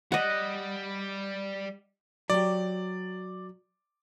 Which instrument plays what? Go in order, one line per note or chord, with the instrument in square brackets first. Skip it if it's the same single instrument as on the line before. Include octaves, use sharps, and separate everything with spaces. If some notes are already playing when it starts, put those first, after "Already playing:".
[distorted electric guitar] G3 [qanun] D#5 F#5
[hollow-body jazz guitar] F#3 G4 [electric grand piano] D5